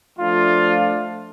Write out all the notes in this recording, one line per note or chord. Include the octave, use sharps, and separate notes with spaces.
F3 A3 D4 F4